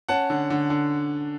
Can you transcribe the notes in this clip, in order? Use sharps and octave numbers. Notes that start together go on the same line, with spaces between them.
C#4 F#5 A5
D3
D3
D3